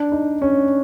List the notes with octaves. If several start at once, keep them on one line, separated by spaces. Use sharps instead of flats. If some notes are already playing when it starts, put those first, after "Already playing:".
Already playing: D4
D#4
C#4